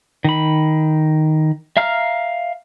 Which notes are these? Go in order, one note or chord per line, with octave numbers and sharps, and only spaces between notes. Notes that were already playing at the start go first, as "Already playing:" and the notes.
D#3 B5
E5 F5 A#5 F6